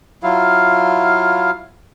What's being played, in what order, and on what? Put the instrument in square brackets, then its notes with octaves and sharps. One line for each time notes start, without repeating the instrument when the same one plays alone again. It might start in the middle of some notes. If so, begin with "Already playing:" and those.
[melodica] F#3 E4 F4 F5